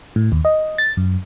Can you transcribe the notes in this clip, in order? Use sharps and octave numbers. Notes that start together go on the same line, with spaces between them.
A2
D#2
D#5
A6
F#2